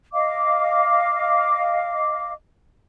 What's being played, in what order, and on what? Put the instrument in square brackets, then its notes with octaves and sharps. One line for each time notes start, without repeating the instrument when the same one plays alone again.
[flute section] D#5 F5 D6